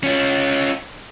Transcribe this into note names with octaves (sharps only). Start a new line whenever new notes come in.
C#4 F4